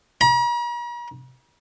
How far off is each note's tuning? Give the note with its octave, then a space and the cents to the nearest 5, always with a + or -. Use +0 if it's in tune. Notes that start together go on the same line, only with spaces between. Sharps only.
A#5 +45